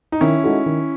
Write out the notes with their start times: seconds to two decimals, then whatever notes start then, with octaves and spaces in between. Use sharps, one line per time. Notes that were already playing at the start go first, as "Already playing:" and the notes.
0.12 D#4
0.21 D#3 C#4 E4
0.43 G#3 D#4 F#4 A4
0.66 D#3